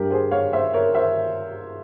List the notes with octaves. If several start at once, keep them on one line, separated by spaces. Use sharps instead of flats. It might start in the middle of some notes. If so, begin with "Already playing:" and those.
Already playing: G2 G3 G4 A#4
G#4 C5
C#5 F5
C5 E5
A#4 C#5
C5 E5